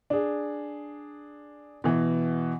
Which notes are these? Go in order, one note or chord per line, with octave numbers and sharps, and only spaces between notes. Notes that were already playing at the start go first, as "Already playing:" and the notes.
D4 G#4
B2 E3